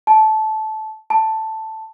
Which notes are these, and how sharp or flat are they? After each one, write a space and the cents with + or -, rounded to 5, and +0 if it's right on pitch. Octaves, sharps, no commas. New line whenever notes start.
A5 -15
A5 +5